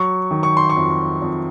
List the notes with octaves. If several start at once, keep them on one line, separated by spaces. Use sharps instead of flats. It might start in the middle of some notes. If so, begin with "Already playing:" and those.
Already playing: F#3 C#6
D#3
C#6
C6
C#6
F2
F2